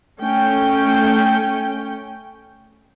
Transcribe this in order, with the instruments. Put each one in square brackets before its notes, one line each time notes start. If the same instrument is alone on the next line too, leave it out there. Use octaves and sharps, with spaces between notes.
[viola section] A3 C#4 G5